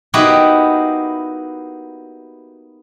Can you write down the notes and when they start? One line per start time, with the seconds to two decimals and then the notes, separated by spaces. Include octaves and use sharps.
0.14 A#3 B3 D#4 E4 F#4 G4